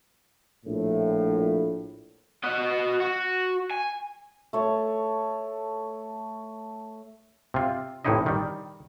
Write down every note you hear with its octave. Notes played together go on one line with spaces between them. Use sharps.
A#1 A2
F#4 D#5
F#4
G#5
A3 C#5
C3 F4
A1 A2 C3 D#4 E4 D#5
D#3 G3